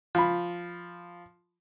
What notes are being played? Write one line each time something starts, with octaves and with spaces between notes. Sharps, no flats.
F3 B5